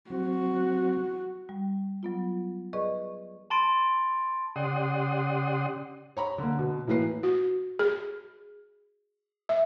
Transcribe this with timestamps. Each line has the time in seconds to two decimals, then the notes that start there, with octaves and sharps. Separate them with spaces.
0.10 F#3 C4 F#4
1.49 G3
2.03 F#3 B3 F4
2.73 G#4 B4 D5 D#5 C#6
3.50 A5 B5 C6 A6 D7
4.56 C#3 G4 D5 F#5 C6 D#6
6.17 C#5 A#5 B5
6.38 D3 A#3
6.59 B2
6.87 A2 E3 A#3 B4 C7
7.23 F#4
7.79 G#4
9.49 E5